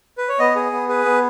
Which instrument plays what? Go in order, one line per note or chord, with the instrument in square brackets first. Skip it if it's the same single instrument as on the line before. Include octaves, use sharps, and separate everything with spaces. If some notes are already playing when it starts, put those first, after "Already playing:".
[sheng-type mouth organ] B4
C#5
B3 D#5
G#4
B3
G#4 B4
B3